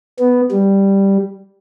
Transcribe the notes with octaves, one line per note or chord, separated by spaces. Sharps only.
B3
G3